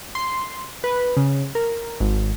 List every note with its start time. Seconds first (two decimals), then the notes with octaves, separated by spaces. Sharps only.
0.15 C6
0.84 B4
1.17 C#3
1.55 A#4
2.00 G#1